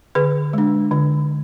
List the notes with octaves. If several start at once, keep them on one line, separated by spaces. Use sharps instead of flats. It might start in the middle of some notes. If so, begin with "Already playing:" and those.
D3 G#4 B4
G#3 D4
D3